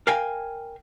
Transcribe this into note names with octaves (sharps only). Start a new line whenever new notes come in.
A#4 F5 G5 G#5